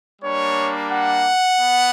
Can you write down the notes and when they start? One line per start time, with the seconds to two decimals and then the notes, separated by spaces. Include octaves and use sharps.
0.22 G3 A#3 D4 C#5
0.91 F#5
1.61 B3